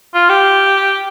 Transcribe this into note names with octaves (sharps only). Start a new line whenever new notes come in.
F4
G4